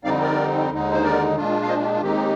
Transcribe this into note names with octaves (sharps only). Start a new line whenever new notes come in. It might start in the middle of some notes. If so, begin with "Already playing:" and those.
F2 D3 G3 C4 D#4 D5 F5
A#4 D5
D#2 D3 G#3 D#4
C5
A#4 D5
A#2 G#3 D4 F4
F5
C5 D#5
F4
G4
F4
D#2 D#3 G#3 C4 D#4 G4